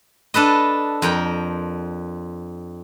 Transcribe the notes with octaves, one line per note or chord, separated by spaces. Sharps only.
D4 A4 B4 D#5
F2 A#4 G5